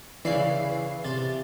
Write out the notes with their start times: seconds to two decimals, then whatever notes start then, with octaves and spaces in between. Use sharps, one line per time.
0.25 C#3 E3 D5 C7
1.05 C3 A6